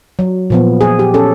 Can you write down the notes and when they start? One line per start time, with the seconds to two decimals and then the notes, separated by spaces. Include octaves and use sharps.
0.19 F#3
0.50 A#2 F3 B3
0.81 G#4
0.99 G4
1.14 C#4 A4